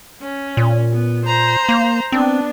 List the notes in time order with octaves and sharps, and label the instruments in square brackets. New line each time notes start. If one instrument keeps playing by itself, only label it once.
[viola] C#4
[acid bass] A#2
[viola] B3
C5 A#5
[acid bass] A#3
[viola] B3 D4 [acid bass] C4